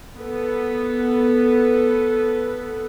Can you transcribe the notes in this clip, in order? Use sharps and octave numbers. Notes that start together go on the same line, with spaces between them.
B3 A4 B4